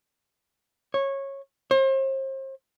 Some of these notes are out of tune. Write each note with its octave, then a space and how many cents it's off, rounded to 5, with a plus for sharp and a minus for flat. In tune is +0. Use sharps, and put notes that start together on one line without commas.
C#5 -15
C5 +40